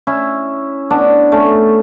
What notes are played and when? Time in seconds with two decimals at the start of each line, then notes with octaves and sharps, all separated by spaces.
0.07 C#4 E4
0.90 B3 D4
1.32 A3 C#4